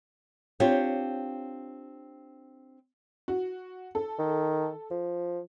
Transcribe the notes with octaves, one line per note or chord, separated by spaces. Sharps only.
C4 D4 F4 G4 C#5
F#4
A4
D#3
F3